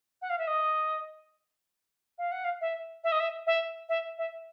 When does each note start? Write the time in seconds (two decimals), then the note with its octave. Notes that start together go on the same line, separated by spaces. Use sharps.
0.21 F#5
0.29 F5
0.38 E5
0.47 D#5
2.18 F5
2.31 F#5
2.44 F5
2.61 E5
3.03 E5
3.11 D#5
3.19 E5
3.46 E5
3.89 E5
4.18 E5